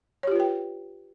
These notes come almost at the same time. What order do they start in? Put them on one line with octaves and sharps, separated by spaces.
C#5 G4 F4 B4 G5